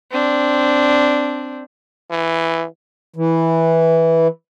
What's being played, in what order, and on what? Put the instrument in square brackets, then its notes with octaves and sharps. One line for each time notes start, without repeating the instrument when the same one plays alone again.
[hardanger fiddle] C4 D4
[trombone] E3
[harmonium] E3